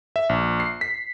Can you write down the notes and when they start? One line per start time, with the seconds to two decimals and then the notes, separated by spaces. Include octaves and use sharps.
0.16 E5
0.29 A#1
0.60 C7
0.81 B6